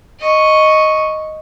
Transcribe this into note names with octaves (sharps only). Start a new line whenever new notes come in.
D#5 C#6